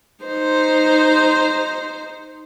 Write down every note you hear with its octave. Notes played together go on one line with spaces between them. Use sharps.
D#4 C5